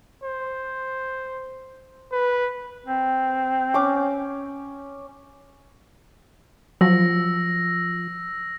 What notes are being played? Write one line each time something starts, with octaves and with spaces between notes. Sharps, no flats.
C5
B4
C4
C#4 D6
F3 F#3 E6 A#6